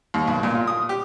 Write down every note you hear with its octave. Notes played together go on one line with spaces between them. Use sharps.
D#2
B1
A#2
F4
D#6
G4